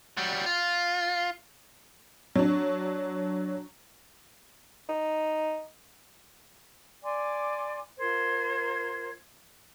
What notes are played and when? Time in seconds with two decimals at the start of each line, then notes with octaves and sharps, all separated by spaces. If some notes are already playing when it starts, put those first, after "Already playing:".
0.17 F#3 G3
0.46 F4
2.35 F#3 D4
4.89 D#4
7.03 D5 G#5 C6 D6
7.98 F4 A#4 C5 G#6